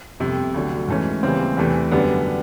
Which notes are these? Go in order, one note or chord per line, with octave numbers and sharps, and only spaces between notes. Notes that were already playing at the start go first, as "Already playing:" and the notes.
G1 F2 C3
D2 D3 F#3
G#2 E3 A3 C#4
D#2 C#3 E3 G3 C4
E2 C3 E3 A3
F#2 D3 G3 B3 D4